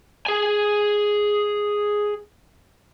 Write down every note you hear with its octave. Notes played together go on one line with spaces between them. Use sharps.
G#4 G#5